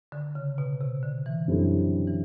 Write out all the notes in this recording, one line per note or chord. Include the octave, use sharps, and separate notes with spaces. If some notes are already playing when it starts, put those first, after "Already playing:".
D3
C#3
B2
C3
D3
E3
F#2 D3 G3 C4 E4
E3